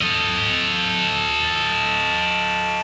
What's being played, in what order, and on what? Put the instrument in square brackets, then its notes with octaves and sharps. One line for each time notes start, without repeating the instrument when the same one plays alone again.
[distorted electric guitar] A4 D#5